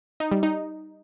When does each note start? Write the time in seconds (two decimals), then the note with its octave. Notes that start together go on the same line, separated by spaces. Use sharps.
0.20 D#4
0.31 G3
0.43 D#4